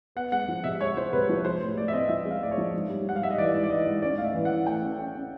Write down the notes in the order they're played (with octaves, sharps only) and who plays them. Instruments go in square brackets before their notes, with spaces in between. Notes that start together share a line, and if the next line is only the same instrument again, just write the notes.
[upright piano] B3 [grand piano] F#5
[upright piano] G#3 [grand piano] F#5
[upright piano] F3
[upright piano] C3 [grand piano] E5
[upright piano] G#3 [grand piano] C#5
[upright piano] F3 [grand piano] C5
[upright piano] C3 [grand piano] B4
[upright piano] F3 [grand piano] C#5
[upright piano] G#3 [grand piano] C5
[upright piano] A2
[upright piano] A2 [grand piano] D5
[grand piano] E5
[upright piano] C4 [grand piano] D#5
[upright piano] F3 [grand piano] E5
[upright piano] G#3
[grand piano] F5
[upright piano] A2 [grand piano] D5
[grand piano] C#5
[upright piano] F3
G#2
G3
[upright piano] G#2 [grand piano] F#5
[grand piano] F5
[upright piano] G3 [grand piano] E5
[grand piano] D#5
[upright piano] E3 [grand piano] D5
[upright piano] G#2
[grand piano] D5
[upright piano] E3 [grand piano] D#5
[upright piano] G#2
[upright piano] C#4 [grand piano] D5
[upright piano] A2 [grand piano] F5
[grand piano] E5
[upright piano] E3
[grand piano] F#5
[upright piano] E3
[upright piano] A3 [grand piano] G5
[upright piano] C#4
C#4
C#4